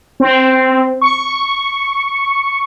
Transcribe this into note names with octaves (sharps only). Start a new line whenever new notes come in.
C4
C#6